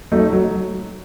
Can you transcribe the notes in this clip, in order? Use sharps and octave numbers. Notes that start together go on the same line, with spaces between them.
F#3 A3 D#4 A4
F#3